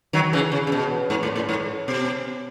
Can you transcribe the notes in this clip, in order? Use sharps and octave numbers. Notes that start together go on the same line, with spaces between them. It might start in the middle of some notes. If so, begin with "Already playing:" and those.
D#3 F#3
C#3 E3
C#3
C#3
B2
G#2
A2
A2
G#2
B2